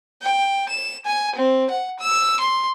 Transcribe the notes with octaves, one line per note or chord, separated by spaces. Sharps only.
G5
E7
G#5
C4
F#5
E6
C6